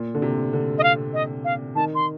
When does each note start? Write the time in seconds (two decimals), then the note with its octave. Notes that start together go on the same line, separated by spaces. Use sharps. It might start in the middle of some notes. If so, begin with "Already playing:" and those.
Already playing: A#2
0.15 D3
0.22 C3
0.53 D3
0.78 D#5
0.83 F5
1.13 D#5
1.44 F5
1.75 D#3 A5
1.95 C6